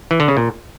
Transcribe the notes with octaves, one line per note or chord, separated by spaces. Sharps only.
E3
D3
C#3
A#2